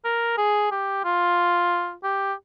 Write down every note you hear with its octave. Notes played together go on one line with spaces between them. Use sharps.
A#4
G#4
G4
F4
G4